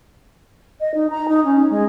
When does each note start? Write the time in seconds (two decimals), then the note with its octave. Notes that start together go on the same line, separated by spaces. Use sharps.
0.80 D#5
0.94 D#4
1.10 A#5
1.28 D#4
1.45 C#4
1.70 G#3